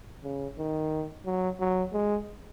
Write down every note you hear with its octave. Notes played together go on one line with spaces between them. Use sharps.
C#3
D#3
F#3
F#3
G#3